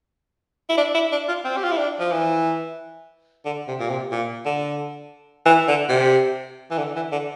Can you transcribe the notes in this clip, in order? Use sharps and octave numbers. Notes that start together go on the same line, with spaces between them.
E4
D4
E4
D4
F4
C4
G4
F4
E4
D4
F3
E3
D3
C3
A#2
C3
A#2
D3
E3
D3
C3
E3
D3
E3
D3